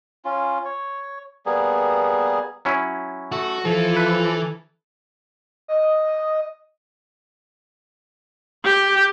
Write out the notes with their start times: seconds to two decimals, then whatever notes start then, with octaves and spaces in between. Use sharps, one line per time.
0.25 C#4 F4
0.65 C#5
1.46 G3 A#3 B3 G#4
2.65 F#3 C#4 E4
3.32 A3 F#4
3.65 E3 F3 A4
3.97 B4 E5
5.68 D#5
8.64 G4